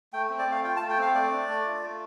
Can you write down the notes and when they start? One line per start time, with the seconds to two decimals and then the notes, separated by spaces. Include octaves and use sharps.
0.13 A3 G5
0.30 C4
0.39 D5
0.47 A3 F5
0.64 F4 G5
0.76 A5
0.81 A3
0.89 G5
0.98 C4 F5
1.15 A3 D5
1.31 D4
1.49 A3
1.66 F4
1.83 A3